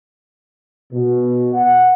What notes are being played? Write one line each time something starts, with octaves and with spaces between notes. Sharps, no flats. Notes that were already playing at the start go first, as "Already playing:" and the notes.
B2
F#5